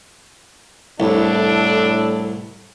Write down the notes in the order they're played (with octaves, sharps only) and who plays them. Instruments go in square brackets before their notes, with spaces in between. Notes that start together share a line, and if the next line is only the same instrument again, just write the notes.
[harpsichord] C2 [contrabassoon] A2 [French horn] D4 [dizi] A4